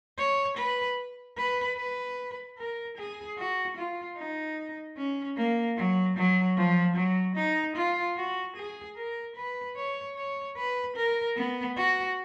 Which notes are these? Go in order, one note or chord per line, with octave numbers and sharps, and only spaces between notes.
C#5
B4
B4
B4
A#4
G#4
F#4
F4
D#4
C#4
A#3
F#3
F#3
F3
F#3
D#4
F4
F#4
G#4
A#4
B4
C#5
C#5
B4
A#4
B3
F#4